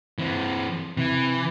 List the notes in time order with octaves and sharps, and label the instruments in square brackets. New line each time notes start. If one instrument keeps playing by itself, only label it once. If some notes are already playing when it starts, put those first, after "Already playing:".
[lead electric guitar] E3 C4
[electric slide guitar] C3 [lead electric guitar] E3